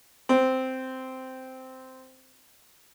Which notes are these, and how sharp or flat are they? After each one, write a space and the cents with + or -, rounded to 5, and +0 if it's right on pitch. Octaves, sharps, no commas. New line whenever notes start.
C4 -10